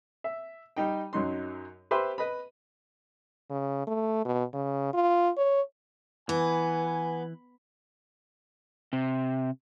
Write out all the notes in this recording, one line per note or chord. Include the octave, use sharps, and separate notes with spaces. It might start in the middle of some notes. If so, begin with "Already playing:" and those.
E5
G3 D#4 G5
F#2 F#3 D#4 C6
G4 B4 C5 E5 C6
B4 D#5 B5
C#3
A3
B2
C#3
F4
C#5
E3 B3 G#5
C3